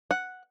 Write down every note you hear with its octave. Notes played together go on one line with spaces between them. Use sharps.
F#5